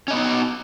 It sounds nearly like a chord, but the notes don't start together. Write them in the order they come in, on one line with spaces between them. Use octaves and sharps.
C#4 D#5 B3 D#4